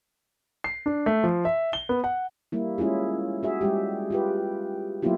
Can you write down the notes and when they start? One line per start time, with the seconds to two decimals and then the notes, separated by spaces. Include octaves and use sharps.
0.64 C7
0.86 D4
1.06 A3
1.24 F3
1.45 E5
1.73 G7
1.89 B3
2.04 F#5
2.52 G3 A#3 E4
2.78 G#3 C#4 E4 F4 G#4
3.43 F#4 G#4 E5
3.61 G3 G#3 G4
4.10 F4 G4 B4
5.02 F#3 A#3 B3 E4 F4 G4